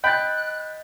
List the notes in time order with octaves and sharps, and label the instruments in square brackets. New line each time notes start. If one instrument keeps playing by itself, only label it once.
[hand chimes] D#5 A6 [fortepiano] G5 B5 [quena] F#6